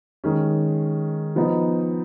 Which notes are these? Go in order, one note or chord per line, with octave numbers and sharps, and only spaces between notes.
D#3 G#3 C#4
F3 B3 D#4